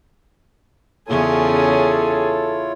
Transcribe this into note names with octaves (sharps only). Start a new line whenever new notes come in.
E2 C#3 C#4 E4 F4 G#4 A4 C#5